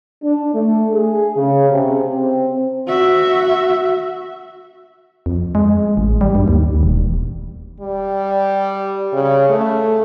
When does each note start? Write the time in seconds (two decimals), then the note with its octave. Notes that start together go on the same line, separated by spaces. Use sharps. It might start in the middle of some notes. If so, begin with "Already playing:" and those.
0.22 D4
0.53 A3
0.93 G#4
1.35 C#3
1.69 C3
2.15 C4
2.87 F#4 E5
5.26 F2
5.55 G#3
5.97 A1
6.21 G3
6.35 G2
6.48 D#2
6.83 E1
7.81 G3
9.13 C#3
9.50 A3